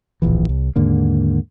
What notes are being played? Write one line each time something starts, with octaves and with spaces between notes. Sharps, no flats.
D1 A#1 E3
C2
D#2 G#2 D3 A#3